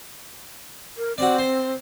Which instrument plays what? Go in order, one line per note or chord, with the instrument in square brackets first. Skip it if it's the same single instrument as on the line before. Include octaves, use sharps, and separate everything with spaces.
[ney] A#4
[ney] C4 [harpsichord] F#4 D5
[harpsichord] C5